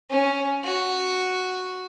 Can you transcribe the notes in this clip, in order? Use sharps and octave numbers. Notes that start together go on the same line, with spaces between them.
C#4
F#4